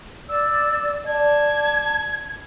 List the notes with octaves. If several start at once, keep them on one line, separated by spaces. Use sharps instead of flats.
D5 E6
D5 A5 G#6